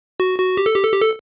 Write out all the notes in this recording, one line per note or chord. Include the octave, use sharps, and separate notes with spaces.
F#4
F#4
G4
A4
G4
A4
G4
A4